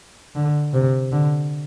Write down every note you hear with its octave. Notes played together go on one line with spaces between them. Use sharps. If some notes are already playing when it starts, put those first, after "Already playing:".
D3
C3
D3